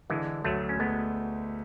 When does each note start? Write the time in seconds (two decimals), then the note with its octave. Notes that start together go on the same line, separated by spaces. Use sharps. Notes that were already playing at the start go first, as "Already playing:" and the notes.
0.10 D3 E3 G#3
0.44 D2 F#3 A3
0.69 C#4
0.80 G#3 A3 B3